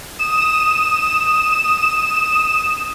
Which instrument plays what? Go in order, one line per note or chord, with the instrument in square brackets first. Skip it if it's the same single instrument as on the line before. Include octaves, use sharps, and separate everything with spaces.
[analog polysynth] D#6 E7